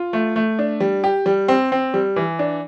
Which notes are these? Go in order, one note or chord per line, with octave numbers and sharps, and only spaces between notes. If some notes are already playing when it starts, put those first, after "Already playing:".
Already playing: F4
A3
A3
D4
G3
G4
G3
C4
C4
G3
E3
D4